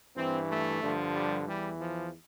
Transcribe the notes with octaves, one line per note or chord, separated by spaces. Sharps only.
G2 E3 C4
A3
G2 D3 F3
G3
E2 E3 G3
F3